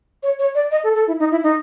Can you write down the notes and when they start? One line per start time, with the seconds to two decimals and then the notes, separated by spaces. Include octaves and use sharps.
0.23 C#5
0.39 C#5
0.55 D5
0.71 D#5
0.84 A4
0.95 A4
1.07 E4
1.20 D#4
1.31 E4
1.43 D#4